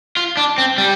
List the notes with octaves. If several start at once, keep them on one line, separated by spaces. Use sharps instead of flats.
F4
D4
C4
G3